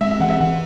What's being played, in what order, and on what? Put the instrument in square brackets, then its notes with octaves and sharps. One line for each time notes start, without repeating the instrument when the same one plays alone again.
[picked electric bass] G#3 [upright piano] E5
[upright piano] E5
[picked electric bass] E3 [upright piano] F#5
[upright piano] E5
[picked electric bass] E3 [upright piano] F#5